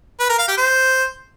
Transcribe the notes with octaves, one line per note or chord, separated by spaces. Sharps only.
B4
A#4
F5
G4
C5